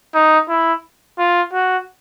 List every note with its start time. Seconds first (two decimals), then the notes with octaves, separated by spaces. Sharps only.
0.15 D#4
0.49 E4
1.19 F4
1.53 F#4